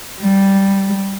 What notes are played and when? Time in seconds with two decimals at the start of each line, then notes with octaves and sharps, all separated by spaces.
0.20 G3